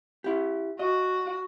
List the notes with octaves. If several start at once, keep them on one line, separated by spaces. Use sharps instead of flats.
E4 G4
F#4 D#5